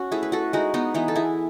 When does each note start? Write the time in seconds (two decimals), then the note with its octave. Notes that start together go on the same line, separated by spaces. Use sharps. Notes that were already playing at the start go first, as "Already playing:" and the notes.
Already playing: C#4 F#4
0.12 A3 E4 G#4
0.23 B4
0.32 F#4 A4
0.53 G#3 D#4 F#4
0.74 B3 D#4
0.94 E3 B3 D#4
1.08 A4
1.15 E4 G#4